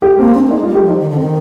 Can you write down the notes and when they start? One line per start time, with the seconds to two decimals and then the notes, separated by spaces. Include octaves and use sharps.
0.02 G#3 G4
0.19 A#3 C4
0.35 C4 D4
0.46 A#3
0.51 G#3 D#4
0.63 G3 F4
0.75 G4
0.84 F3 D#4
1.00 D#3
1.10 D3
1.17 D#3 C4